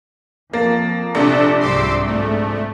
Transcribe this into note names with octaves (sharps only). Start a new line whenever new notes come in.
F2 A#3 A5
A#1 C3 D4 G4 A4
C2 G#2 C6 D6 E6
G#2 A3